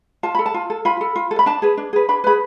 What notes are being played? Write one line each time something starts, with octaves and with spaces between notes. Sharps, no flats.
F4 A5
A4 B5
A5
F4
A4
F4 B5
A4
F4
A4
B5
D4 A5
G#4 B4
D4
G#4 B4
D4 B5
G#4 B4 B5